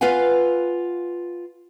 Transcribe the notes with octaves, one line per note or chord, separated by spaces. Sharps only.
F4 B4 F5 F#5 G#5